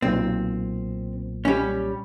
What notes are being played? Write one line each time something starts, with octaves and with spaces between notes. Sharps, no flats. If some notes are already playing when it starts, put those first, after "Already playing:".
B1 A#2 C4
G3 C#4